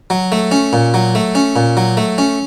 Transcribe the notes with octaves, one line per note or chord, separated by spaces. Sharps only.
F#3
A3
C#4
A#2
F#3
A3
C#4
A#2
F#3
A3
C#4